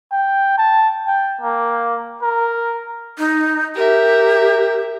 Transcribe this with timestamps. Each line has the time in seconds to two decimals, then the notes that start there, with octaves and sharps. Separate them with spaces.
0.12 G5
0.58 A5
1.06 G5
1.41 A#3
2.22 A#4
3.18 D#4
3.75 G4 A#4 E5